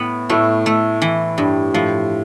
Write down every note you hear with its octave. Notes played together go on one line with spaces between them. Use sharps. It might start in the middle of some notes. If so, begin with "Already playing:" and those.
Already playing: A2 B3
A2 A3
A3
E3
G2
A2 F3